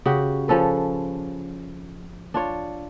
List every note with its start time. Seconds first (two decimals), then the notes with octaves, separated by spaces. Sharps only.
0.06 C#3 F#4 G4
0.48 F3 C#4 A4 B4
2.34 D4 F4 C#5